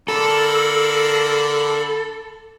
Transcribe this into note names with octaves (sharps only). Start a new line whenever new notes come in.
D3 A#3 A4 B5